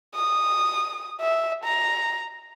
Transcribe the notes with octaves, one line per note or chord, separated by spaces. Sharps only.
D#6
E5
A#5